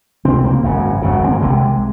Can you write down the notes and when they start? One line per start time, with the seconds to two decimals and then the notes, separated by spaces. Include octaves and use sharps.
0.25 C#2 C3 C4
0.44 A#3
0.63 G#1 F#2 C#3
1.02 G#1 F#2 C#3
1.24 C4
1.33 A#3
1.41 C2 C3 G#3